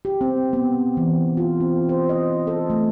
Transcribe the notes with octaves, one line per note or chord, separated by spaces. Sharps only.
G4
C4
B3
E3
F4
C4
C5
D#5
A4
A3